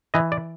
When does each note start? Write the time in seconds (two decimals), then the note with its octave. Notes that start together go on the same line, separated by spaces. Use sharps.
0.14 E3 D#5
0.32 D5